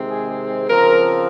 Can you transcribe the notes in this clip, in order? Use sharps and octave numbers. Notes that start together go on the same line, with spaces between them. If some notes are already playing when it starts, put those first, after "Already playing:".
Already playing: C3 D#3 G#3 C4
G#4
C#3 F3 C4 A#4